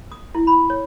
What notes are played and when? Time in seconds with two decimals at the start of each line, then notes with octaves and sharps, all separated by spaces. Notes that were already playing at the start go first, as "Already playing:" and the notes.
0.12 D#6
0.35 E4
0.47 B5
0.70 C#5